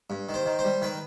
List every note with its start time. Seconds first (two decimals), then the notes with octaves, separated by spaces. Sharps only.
0.10 G2
0.29 D#3
0.34 C5
0.46 D#3
0.59 C5
0.64 G3
0.82 D#3 B4